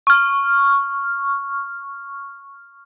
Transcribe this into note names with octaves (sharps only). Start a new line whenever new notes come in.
C#6 F6